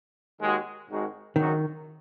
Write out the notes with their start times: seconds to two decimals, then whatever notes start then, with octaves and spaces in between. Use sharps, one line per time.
0.39 D#2 D#3 G#3 F#4
0.88 G#1 G#2 D#3 G#3 F#4
1.36 G#1 F#2 D#3 F#3 D#4 F#4